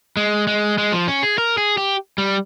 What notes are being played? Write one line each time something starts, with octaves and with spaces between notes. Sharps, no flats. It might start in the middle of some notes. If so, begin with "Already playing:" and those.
G#3
G#3
G#3
F3
C#4
G#4
A#4
G#4
G4
G3